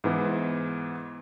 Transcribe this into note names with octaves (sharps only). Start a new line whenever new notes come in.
G#2 E3 B3